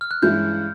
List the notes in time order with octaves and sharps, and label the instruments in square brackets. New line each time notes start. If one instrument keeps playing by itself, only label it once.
[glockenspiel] F6
F#6
[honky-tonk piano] G2 E3 G#3 C#4 E4 [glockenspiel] G6